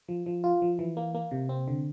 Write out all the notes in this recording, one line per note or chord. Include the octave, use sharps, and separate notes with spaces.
F3
F3
F4
F3
E3
A#3
A#3
C3
C4
D3